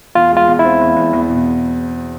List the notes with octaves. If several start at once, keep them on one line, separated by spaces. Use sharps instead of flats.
E2 F4
G#3
F4
E2
C4 E4
E2
E2
E2
B2